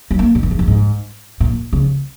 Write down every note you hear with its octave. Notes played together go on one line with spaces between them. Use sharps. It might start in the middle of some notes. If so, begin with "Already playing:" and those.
F#3
A#3
A#2
F#2
E2
F#2
G#2
A#2
C#3